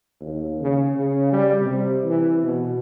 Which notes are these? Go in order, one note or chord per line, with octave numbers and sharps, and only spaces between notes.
D#2
C#3
C#3
G3
C3
E3
B2